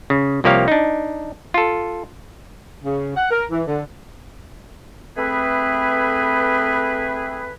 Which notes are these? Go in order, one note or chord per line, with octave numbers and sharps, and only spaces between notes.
C#3
C2 F3 A#3 G4 C#5 F5
D4 D#4
F4 A4
C#3
F#5
A#4
E3
D3
A3 C4 G#4 B4